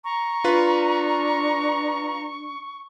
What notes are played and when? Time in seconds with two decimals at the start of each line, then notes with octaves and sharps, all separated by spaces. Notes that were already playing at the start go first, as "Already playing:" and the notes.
0.04 A#5 C#6
0.44 D4 F4 B4